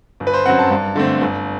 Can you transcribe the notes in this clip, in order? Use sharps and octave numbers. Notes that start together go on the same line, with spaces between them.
G1
B4
C5
F#2 F#3 C4 F#5
A5
G2
D3 A3 C4
G1